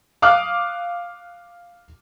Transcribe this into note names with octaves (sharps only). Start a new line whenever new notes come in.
F5 D6 D#6 F6 F#6